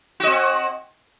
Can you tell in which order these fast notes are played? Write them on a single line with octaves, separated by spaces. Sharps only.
F#4 D#5 C4